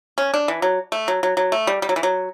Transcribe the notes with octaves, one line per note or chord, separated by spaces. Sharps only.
C#4
D4
E3
F#3
A3
F#3
F#3
F#3
A3
G3
G3
F#3
E3
F#3